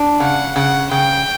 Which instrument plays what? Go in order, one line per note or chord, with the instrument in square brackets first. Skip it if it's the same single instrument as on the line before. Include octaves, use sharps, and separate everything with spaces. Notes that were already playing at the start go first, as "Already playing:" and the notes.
Already playing: [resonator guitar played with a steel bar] D4
[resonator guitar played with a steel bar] C#3 [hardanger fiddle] F#5
[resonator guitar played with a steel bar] C#3 [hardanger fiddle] F#5
[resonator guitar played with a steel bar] C#3 [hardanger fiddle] G5